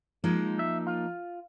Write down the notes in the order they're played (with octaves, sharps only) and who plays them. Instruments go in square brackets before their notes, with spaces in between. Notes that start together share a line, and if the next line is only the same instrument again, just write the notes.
[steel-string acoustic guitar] F3 A#3 D#4 [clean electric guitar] G#3
[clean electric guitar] E5
F4